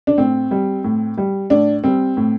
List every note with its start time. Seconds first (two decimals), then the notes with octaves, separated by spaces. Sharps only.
0.07 D4
0.17 A2 C4
0.51 G3
0.84 A2
1.18 G3
1.50 A2 D4
1.84 G3 C4
2.17 A2